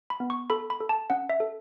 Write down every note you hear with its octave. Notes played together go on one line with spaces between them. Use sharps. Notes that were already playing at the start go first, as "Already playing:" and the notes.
B5
B3
C#6
A4 B5
B5
A4
A5
C#4 F#5
E5
A4